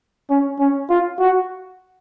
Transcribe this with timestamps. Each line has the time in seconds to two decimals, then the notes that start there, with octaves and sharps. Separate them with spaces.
0.30 C#4
0.59 C#4
0.90 F4
1.19 F#4